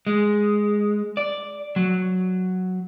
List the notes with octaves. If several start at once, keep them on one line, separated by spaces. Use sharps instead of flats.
G#3
D5
F#3